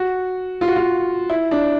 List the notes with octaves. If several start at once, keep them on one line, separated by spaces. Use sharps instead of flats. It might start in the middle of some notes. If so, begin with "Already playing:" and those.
Already playing: F#4
F4
F#4
F4
E4
D4